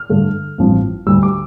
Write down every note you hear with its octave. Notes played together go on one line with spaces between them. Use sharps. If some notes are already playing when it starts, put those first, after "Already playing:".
Already playing: F6
G2 D3 A3
A1 G2 F3 C4
D2 D3 G3 E6
D6